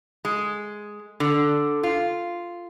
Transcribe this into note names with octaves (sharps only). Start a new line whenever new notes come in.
G#3
D3
F4